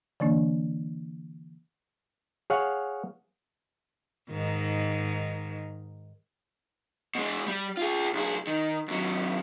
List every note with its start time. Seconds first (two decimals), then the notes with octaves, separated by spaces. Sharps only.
0.20 D3 E3 A#3 D4
2.50 G#4 C#5 F5 F#5
4.31 G#2 D#3
7.15 B2 G#3
7.47 G3
7.77 F4 G#4
8.13 B1 G#4
8.47 D#3
8.88 D#2 F#3